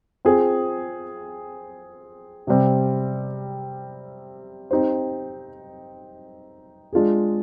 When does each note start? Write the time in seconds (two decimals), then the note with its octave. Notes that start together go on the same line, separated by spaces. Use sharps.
0.25 C4 F4 G#4 C5
2.47 C3 G3 C4
4.71 C4 D#4 G4 C5
6.93 G#3 D4 F4 G#4